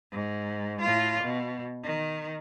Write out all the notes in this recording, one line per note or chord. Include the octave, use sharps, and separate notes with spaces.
G#2
A2 F4
B2
D#3